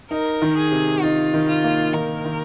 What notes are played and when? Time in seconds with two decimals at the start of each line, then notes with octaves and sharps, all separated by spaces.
0.11 D#4 A#4
0.42 D#3
0.57 G#4
0.72 C3
1.02 D#4 F4
1.34 D#3
1.48 F4
1.64 A#3
1.93 D#3 A#4
2.25 D#3